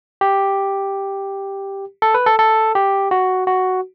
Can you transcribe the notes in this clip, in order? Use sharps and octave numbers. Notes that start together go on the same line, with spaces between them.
G4
A4
B4
A4
A4
G4
F#4
F#4